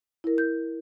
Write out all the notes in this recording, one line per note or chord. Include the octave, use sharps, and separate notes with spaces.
E4 A#4
G6